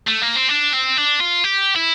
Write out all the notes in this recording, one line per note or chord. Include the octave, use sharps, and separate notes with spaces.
A3
A#3
C4
D4
C4
D4
F4
G4
E4